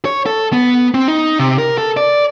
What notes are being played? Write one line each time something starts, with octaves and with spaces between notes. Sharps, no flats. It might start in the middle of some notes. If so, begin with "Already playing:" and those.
C#5
A4
B3
C4
D#4
C3
A#4
A4
D5